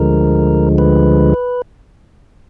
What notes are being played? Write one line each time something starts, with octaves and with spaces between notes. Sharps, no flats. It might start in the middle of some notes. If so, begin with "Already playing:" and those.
Already playing: D2 D3 F3 G#3 A#4
B4